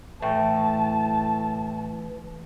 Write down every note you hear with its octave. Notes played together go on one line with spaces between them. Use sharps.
A2 E3 E5 G5 A5